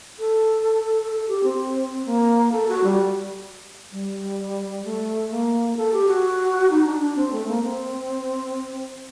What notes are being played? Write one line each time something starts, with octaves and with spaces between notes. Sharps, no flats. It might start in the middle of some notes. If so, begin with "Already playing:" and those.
A4
A4
G4
C4
A#3
A4
F#4
G3
G3
A3
A#3
A4
G4
F#4
D#4
D4
D4
C4
A3
A#3
C4